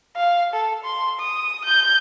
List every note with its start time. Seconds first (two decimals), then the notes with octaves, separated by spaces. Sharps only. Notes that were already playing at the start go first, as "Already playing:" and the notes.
0.16 F5
0.54 A4
0.84 C6
1.20 D#6
1.65 G6